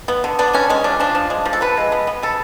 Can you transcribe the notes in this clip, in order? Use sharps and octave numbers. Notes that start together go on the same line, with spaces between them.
B3
D3
B3 D4
D3 C#4
G#3 C#4
F3 D4
F3 D4
F3
G#3
F3
A4
D3 B4
G#3
B3
B3
C#3 A4